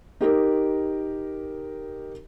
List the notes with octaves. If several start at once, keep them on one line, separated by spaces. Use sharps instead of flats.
D#4 G4 A#4